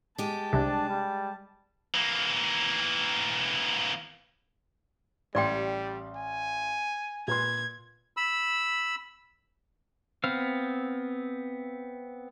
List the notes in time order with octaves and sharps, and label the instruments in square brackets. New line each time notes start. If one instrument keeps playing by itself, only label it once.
[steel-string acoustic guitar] G#3 G4 [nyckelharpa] A5
[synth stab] C2 C3 [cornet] D4
[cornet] G3
[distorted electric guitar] E3 A#3
[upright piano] A1 C6 [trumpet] G3 [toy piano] D5 G5
[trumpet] G#5
[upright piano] A#2 B4 C6 [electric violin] G#6
[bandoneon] B5 E6
[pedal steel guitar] B3 C4 F5